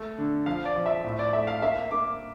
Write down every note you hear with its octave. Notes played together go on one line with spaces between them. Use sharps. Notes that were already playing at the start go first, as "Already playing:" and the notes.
Already playing: A3
D3
F3 F5
D5
F3
E5
A2
D5
A3 E5
F5
A#3 E5
A#3 D6